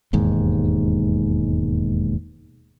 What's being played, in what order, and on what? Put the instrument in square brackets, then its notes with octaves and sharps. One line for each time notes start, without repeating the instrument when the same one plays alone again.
[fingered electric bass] E1 D#2 G#2